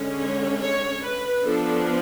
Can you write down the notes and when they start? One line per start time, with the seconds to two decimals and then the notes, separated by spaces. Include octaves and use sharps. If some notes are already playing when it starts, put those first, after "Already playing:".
Already playing: D3 G#3 C#4
0.20 C#5
0.62 C#5
1.03 B4
1.44 F3 B3 D4 A4